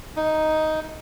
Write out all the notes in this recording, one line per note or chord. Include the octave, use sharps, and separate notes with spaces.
D#4